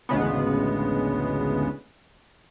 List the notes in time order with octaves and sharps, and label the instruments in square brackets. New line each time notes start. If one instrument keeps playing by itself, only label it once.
[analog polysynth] A1 D2 C#3 G#3 B3